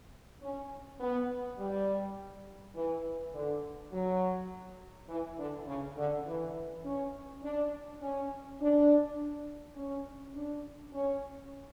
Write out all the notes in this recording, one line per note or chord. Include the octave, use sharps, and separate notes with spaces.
C#4
B3
G3
E3
D3
F#3
E3
D3
C#3
D3
E3
C#4
D4
C#4
D4
C#4
D4
C#4